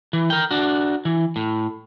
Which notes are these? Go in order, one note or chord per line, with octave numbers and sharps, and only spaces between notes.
E3
A#4 G5
D4 F#4
E3
A2